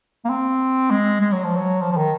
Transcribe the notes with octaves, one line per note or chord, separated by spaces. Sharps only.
A#3
C4
G#3
G#3
F#3
F3
F#3
F3
F3
D#3